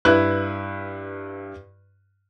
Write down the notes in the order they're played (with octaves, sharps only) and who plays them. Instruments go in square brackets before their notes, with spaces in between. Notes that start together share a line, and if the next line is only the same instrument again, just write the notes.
[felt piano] G2 E4 B4 F#6